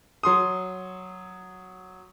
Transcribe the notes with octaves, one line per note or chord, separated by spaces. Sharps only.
F#3 C6 D#6